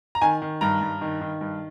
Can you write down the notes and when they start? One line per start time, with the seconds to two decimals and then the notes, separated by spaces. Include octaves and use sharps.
0.15 A#5
0.21 D#3 G#5
0.42 D#3
0.61 G2 A#5
0.81 G2
1.01 D#3
1.21 D#3
1.41 G2